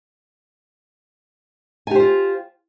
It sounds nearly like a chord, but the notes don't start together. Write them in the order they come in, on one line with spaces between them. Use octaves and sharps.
G#5 G4 C5 F4